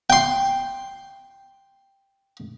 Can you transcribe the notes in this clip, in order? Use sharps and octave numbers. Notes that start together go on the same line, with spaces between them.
G5 C6